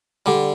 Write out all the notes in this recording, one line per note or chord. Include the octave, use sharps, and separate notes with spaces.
D3 G3